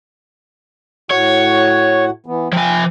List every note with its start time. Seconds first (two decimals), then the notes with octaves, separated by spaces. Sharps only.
1.11 A2 F#4 C#5 F#5
2.26 E3 B3
2.53 F3 G5 G#5